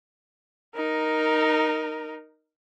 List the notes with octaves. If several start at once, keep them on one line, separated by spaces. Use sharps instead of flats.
D#4 A#4